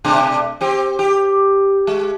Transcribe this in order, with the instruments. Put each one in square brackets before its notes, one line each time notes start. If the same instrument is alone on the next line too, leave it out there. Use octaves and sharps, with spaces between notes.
[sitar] B2 A3 D4
C4 G4
G4
G#3